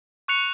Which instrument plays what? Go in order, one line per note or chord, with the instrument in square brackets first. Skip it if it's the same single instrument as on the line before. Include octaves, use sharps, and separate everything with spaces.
[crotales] C#6 F#6 C#7 F7